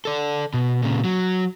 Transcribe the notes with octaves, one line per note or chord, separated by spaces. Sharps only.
A4 D5
B2
A#2 C#3
F#3